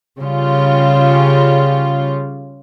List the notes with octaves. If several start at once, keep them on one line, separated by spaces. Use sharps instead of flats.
C#3 G3 F4